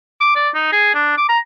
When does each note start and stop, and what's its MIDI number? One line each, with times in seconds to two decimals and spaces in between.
0.21 0.34 86
0.36 0.49 74
0.54 0.71 63
0.72 0.94 68
0.95 1.16 62
1.18 1.26 86
1.29 1.38 82